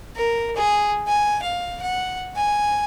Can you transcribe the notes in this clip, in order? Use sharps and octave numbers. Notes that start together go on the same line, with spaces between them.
A#4
G#4
G#5
F5
F#5
G#5